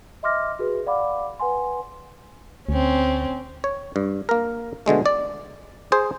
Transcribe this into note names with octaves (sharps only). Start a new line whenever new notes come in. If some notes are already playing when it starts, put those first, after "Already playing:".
D#5 E5 C6 D6 F6 A#6
F#4 G#4 B4
D5 F5 F#5 B5 D6
B4 F#5 G#5 C6
D2 C4 C#4
C#5
G2
A#3 A#4
B2 D3 G#3 A3
D5
G#4 C5